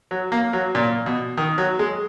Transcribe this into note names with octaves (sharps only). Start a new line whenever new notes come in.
F#3
A#3
F#3
A#2
B2
D#3
F#3
G#3